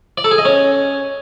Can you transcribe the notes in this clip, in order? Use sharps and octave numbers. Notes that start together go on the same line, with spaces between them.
D5
A4
G#4
D#5
C#4